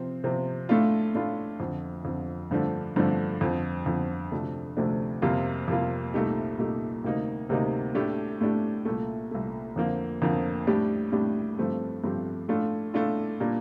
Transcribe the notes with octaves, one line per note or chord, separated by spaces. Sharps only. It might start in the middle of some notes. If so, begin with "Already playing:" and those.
Already playing: C3 F3 C4
C3 F3 C4
A2 A3 D4 F4
A2 A3 D4 F4
F2 D3 F3
F2 D3 F3
G2 D3 F3 A3 D4
G2 D3 F3 A3 D4
F2 D3 F3
F2 D3 F3
D2 C3 F3 A3 D4
D2 C3 F3 A3 D4
F2 C3 G3 A#3 F4
F2 C3 G3 A#3 F4
C2 A#2 A3 D#4 G4
C2 A#2 A3 D#4 G4
D2 C3 G3 A#3 D#4
D2 C3 G3 A#3 D#4
A2 A3 D4 G4
A2 A3 D4 G4
C2 A#2 A3
C2 A#2 A3
F2 D3 F3 A#3
F2 D3 F3 A#3
A2 G3 D4 G4
A2 G3 D4 G4
G2 F3 A3 C4 G4
G2 F3 A3 C4 G4
A2 A3 D4 F4
A2 A3 D4 F4
A#2 G3 A#3 D4